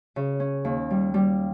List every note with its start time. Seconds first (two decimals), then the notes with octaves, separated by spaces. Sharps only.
0.16 C#3
0.40 C#4
0.65 D#2
0.91 G3
1.14 G3